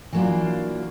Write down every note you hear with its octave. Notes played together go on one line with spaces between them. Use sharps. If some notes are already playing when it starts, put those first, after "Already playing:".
E3 F#3 A#3 D4 F4